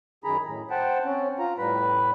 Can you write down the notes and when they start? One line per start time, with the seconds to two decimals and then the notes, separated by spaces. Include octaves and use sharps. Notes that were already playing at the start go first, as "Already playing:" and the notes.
0.24 F#2 D#3 G#4 A#5 B5
0.45 A2
0.70 C5 F#5 G5 A5
1.05 C4 C#4
1.39 F4 A#5
1.58 A2 G3 B4 B5